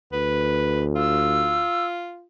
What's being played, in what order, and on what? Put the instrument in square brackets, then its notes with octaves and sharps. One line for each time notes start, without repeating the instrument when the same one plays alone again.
[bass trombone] D2 [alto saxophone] B4
[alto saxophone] F4 [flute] E6